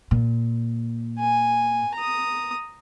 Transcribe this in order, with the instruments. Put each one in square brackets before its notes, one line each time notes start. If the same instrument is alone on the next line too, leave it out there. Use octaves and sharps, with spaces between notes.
[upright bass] A#2
[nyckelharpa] G#5
A#5 D#6